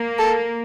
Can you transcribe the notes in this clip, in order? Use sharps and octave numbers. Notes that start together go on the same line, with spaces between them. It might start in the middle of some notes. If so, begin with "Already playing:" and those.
Already playing: A#3
A4